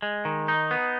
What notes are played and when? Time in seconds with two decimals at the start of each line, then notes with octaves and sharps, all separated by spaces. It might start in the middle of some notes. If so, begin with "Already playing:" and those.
0.02 G#3
0.25 D#3
0.48 D#4
0.71 B3